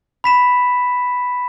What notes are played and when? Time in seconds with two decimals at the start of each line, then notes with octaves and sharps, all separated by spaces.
0.24 B5 B6 E7